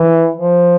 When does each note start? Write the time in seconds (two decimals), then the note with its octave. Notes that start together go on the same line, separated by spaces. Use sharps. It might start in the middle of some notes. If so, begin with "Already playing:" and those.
Already playing: E3
0.37 F3